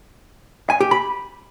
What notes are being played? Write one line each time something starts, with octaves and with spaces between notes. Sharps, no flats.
G#5
G4
B5